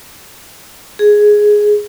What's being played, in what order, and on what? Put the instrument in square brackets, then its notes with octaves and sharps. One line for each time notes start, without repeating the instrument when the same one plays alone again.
[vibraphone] G#4